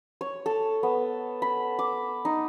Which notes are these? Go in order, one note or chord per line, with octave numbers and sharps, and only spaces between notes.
C#5
A4
B3
B5
D6
D#4